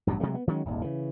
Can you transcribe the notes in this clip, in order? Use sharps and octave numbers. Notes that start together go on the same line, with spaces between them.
A1 G2 B2 F#3
C3 F#3 G#3 A3
B3
D#3 F#3 G#3 C#4
D#1 G#1 D#2
C#3 E3